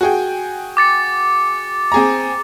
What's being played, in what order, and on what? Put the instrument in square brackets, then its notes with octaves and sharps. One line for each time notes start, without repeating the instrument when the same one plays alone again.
[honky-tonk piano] F#4 G#4 G5
[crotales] D6 A6 C#7
[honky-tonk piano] C4 G#4 A#5